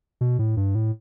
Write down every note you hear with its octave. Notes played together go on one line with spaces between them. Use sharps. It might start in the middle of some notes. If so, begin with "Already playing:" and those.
B2
A2
G2
A2